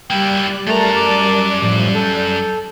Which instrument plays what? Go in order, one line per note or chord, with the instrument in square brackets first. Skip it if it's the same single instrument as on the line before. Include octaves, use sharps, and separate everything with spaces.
[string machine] G3 D5 F#6 [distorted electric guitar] A#3 E4 [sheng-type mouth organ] G5
[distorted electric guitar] F#2 A#5 [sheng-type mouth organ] A3 [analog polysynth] A#4 A5 A6
[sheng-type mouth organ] D6
[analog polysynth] A2 F3
[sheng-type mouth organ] A4 [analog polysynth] G6